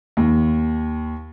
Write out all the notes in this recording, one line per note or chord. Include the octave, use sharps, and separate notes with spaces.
D#2